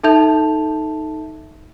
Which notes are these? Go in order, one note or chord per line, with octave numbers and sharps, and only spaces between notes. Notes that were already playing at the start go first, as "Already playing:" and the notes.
D#4 A4 E5 A5 G6 F7